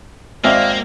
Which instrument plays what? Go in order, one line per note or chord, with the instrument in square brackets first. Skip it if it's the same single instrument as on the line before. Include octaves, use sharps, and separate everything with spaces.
[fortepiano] G#1 C4 G5 [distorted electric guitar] A#3 [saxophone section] D5 F5 [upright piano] E5